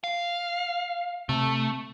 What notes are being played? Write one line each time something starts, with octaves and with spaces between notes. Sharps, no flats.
F5
C3 A3